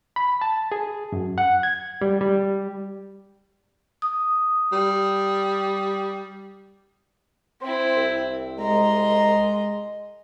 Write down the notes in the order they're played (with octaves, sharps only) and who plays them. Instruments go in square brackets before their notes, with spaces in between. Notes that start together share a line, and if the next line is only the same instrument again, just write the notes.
[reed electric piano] B5
A5
G#4
F#2
F#5
G#6
G3
G3
[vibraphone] D#6
[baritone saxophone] G3
[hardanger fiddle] C4 E4 [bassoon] C5
[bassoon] C2
[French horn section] G#3 D#5 [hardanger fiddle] A#5 C6